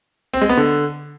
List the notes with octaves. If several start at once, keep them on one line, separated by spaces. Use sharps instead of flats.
C4
G#3
B3
D3